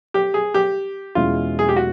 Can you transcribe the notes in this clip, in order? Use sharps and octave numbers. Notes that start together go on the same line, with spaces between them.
G4
G#4
G4
E2 B2 G#3 C#4 E4 F4
G#4
G4
F#4